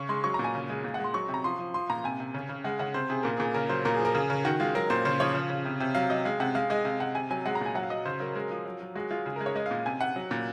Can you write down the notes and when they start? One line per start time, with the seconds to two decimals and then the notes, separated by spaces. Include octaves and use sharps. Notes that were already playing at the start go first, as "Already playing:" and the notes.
Already playing: C#3 C#6
0.09 G#3 C6
0.24 F#3 C#6
0.34 A#2 A#5
0.44 G#5
0.55 C#3
0.70 G#3
0.84 A#2
0.94 G#3 F#5
1.04 C6
1.14 F#3 C#6
1.29 C3
1.34 A#5
1.44 F3 C6
1.59 F3
1.74 F3 C6
1.90 A#2 A#5
2.04 C3 G#5
2.20 C3
2.34 C#3
2.49 C#3
2.64 G#3 F#5
2.79 C#3 F#5
2.94 C3 C5
3.10 C3 G#4
3.23 A#2 A#4
3.37 A#2 G#4
3.54 C#3 A#4
3.69 F#3 C5
3.85 A#2 A#4
3.94 G#4
4.00 F3
4.05 A#4
4.15 C#3 G#4
4.30 C#3 A#4
4.45 D#3 F#4
4.60 G#3 F4
4.75 F#3 A#4
4.90 A#2 C5
5.05 C#3 C5
5.20 F3 C#5
5.35 C#3
5.50 C#3
5.65 C3
5.80 C3
5.95 F#3 F5
6.10 F#3 D#5
6.25 G#3 F5
6.40 C3 F#5
6.55 G#3 F5
6.70 G#3 D#5
6.85 C3 F5
7.00 C3 F#5
7.15 C3 G#5
7.31 F#3 G#5
7.46 G#3 F#5
7.55 A#5
7.61 A#2 G#5
7.75 F#3 F#5
7.83 F5
7.90 F#3 D#5
8.05 C#3 C5
8.20 F#3 A#4
8.35 G#3 A#4
8.50 F3
8.66 F#3
8.80 F#3
8.96 G#3 F#4
9.11 G#3 F4
9.26 C#3 G#4
9.36 G#3 A#4
9.46 C#5
9.56 G#3 D#5
9.66 F5
9.71 A#2
9.86 C3 G#5
10.01 C3 F#5
10.16 F#3
10.31 A#2